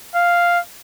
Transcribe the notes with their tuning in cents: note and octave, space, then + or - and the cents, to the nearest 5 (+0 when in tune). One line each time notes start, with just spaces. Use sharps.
F5 +0